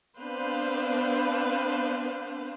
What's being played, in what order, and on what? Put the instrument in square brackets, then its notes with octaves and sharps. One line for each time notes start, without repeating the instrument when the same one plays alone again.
[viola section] B3 C4 D4 B4 C5 F5